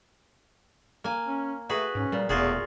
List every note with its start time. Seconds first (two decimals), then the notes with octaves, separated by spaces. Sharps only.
1.04 A#3 G#5
1.27 C#4
1.69 A3 F#4 G#4 B4
1.95 G#2 C#4
2.12 A#2 G3
2.29 E1 E2 A3 F4 F#4 G#4